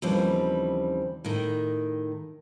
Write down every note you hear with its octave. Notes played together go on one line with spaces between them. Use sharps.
D#2 C#3 E3 F3 G3 C4
A2 D#3